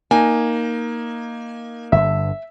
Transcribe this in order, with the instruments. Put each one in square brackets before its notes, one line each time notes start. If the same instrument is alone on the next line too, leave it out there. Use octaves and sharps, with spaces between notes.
[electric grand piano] A#3 D#4 [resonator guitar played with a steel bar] G#5
[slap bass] G1 G2 D3 [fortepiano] E5